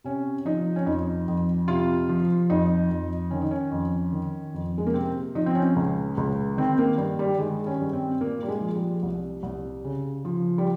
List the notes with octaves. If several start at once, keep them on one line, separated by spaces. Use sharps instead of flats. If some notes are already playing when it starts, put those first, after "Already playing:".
C3 C#4
F3 D#4
C#4
F2 D#4
F2
C3 F4
F3
F2 D#4
F2
D#3 C#4
D#4
C#4
F2
D#3
F2
G#3
A#3
C3 C4
F3 D#4
C4
C#4
C#2
C#2
D#3 C4
A#3
G2
G3
D#3 G#3
C#4
G2
C4
A#2 A#3
G3
G#3
F3
G3
C2
C2
C#3
F3
G3